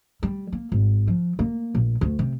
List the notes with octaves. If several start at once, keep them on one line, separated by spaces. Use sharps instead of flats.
G3
A#3
G#1
F3
A#3
A#1
D2
C3